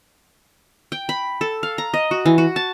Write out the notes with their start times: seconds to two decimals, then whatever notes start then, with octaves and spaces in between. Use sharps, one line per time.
0.92 G5
1.09 B5
1.41 A4
1.63 F5
1.78 A#5
1.94 D#5
2.11 F#4
2.26 E3
2.38 F#4
2.56 A5